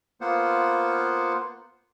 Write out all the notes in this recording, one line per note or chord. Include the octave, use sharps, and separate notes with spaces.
A#3 B3 F4 C5 F#5